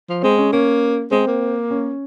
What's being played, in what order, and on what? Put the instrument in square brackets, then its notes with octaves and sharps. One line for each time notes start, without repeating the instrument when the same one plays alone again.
[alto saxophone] F3
[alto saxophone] G#3 [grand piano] C4
[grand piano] C#4
[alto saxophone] A#3 [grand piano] C#4
[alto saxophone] G#3 [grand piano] C4
[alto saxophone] A#3
[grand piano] C#4